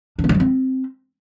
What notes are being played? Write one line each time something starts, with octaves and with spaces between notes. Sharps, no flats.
D4
B3
D#4
F#3
C4